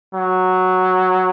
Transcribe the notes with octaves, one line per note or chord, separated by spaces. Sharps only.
F#3